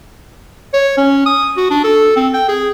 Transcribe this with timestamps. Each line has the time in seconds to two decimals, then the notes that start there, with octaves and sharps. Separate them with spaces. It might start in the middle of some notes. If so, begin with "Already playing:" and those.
0.74 C#5
0.98 C#4
1.26 D#6
1.57 F#4
1.71 D4
1.84 A4
2.16 C4
2.34 G5
2.49 G#4